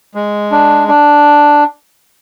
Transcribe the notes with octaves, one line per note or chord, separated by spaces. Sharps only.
G#3
D4
D4